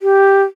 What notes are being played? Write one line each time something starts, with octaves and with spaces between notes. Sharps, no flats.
G4